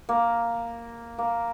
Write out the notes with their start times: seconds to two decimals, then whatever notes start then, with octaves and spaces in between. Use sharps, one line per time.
0.09 A#3
1.18 A#3